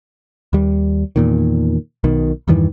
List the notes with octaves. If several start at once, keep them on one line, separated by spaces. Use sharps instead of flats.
D#2 G3
E2 A#2 D#3
B1 B2 D#3
E2 G2 D#3 E3